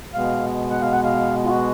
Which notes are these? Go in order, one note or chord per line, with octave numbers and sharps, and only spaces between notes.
B2 G#3 B3 F5
F#5
F5
F#5
F5
F4
F#4